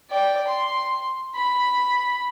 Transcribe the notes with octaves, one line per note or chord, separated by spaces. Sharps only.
D5 G5
C6
B5